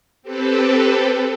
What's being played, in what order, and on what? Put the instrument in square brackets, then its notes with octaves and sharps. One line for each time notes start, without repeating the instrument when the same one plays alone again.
[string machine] C4 G4 A4 B4